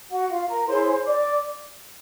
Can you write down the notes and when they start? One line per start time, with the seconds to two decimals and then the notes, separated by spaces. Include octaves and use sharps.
0.12 F#4 F#5
0.30 F4 F5
0.49 A#4 A#5
0.67 E4 G#4 C5 C#5 C6
1.05 D5 D6